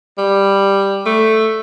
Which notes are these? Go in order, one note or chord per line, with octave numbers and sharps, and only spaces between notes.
G3
A3